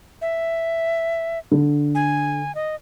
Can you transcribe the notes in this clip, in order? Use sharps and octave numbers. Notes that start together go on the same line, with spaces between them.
E5
D3
G#5
D#5